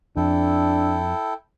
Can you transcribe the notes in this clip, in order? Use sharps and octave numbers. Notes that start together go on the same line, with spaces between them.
F2 D4 E4 A4 G5